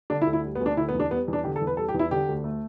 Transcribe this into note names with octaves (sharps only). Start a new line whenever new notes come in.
D3 D4
E4
D2
E4
G3
B3
D2
D4
D3 E4
B3
E2
D4
G3 B3
E2
D4
D3 G4
A4
E2
B4
G3 A4
G4
E2
E4
D3 G4
D2
A3